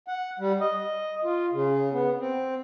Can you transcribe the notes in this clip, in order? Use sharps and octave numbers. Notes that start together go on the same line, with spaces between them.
F#5
G3
D#5
F4
C#3
B3
C4